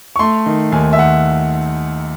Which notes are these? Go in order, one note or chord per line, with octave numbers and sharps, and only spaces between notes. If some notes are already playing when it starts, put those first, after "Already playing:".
C#6
A3 C6
D#3
D#2 G#5
E5
D#2 F#5